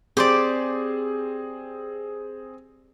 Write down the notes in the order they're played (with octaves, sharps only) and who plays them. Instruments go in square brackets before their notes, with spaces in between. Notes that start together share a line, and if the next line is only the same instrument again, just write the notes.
[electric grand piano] C4 G#4 [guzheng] G4 C5 D5